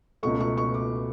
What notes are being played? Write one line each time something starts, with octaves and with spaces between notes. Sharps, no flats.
C#2 B2 A3 C#6
C#6
C#6
D6